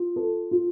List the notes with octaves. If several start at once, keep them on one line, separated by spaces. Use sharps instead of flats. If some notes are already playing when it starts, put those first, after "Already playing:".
Already playing: F4
A4
F4